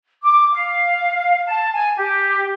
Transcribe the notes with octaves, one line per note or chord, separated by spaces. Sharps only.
D6
F5
A5
G#5
G4